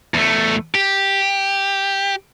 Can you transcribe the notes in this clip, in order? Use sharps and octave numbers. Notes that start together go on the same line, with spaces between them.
E2 A3
G4